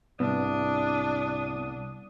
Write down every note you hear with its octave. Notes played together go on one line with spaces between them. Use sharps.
C2 G#2 B3 D4 D#6